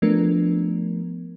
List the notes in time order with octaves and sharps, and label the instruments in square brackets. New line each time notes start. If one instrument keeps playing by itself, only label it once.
[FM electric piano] F3 A3 B3 D4 A#4